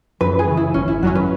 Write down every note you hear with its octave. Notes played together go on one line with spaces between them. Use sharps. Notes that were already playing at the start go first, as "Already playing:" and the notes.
F#2 B4
G#4
C#3 E3
E4
G#1 C#4
E4
F#2 F#3 C#4 F#4
B4